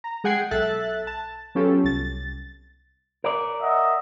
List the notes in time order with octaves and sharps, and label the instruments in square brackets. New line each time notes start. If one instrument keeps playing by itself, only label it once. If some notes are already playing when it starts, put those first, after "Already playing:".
[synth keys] A#5
G#3 G#4 F#5 G5 G#6 C7
B1 A4 E5 F#6 A6
A5
F#3 B3 C#4 F4 G4 A4
C2 A6
[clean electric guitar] A#4 D5
[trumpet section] D#5 E5 F#5